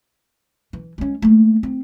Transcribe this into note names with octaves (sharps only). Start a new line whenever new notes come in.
E3
G#3 C#4
A3 A#3
C4